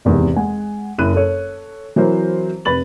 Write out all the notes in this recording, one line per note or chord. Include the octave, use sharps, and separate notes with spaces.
G#1 E2 G#2 C3
G#3 F#5 G#5
F#1 E4 B5 F#6 D#7
A4 C#5
E3 F#3 C4 A#4 C5
F1 B4 B5 A6 F#7